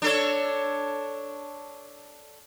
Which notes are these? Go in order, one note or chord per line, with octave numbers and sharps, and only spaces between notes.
D4 A4 C#5